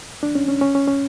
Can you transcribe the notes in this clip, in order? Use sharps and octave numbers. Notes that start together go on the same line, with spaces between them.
D4
C#4
C#4
C#4
C#4
C#4